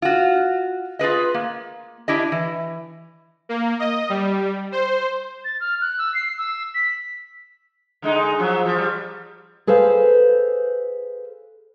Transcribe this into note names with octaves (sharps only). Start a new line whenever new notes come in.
F4 F#4
F4 G#4 B4 D#5
A#3
D4 E4 G4 D#5
E3
A#3
D#5
G3
C5
A6
F6
F#6
E6
C7
E6
B6
D3 G#3 D#4
F3 F#3
F3
G3
G#4 A4 B4 C5 F5